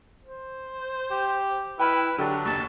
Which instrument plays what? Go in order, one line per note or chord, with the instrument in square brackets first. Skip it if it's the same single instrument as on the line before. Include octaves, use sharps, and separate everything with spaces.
[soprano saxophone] C5
[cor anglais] G4
[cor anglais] E4 [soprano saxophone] B4 [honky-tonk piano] G5 B5 F6
[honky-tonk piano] D3 G4 A4 [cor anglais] F#3 [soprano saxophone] D4
[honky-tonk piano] F#1 D#2 [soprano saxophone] A5